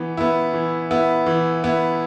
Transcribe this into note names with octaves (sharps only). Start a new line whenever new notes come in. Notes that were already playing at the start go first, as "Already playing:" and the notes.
Already playing: E3 B3
B3 E4
E3
B3 E4
E3
B3 E4